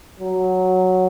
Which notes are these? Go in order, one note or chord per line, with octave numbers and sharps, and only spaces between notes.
F#3